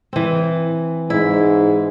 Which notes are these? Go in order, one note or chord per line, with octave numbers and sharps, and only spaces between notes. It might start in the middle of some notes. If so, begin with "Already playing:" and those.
E3 C4
G#2 E4